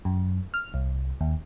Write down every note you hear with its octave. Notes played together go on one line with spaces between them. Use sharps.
F#2
F6
C2
D#2